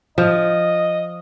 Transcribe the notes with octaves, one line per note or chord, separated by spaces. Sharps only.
F3 D#5